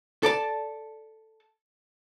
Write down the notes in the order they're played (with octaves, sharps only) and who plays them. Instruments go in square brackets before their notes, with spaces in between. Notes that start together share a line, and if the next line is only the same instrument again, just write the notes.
[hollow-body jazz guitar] A4 D5 A5